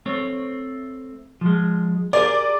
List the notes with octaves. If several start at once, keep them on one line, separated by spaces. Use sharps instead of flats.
A3 C4 C#5
F3 G#3
G4 G#4 A#4 D5